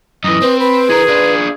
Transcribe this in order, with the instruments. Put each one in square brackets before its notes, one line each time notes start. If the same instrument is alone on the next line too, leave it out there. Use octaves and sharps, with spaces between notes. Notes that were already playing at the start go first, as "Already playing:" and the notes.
[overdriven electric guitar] F#2 E3 [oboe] D#5
[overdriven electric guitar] C4 C5 [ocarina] B4
[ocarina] B4 [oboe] B5
[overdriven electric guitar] E3 A#4 [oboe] G#4
[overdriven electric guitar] D4 F4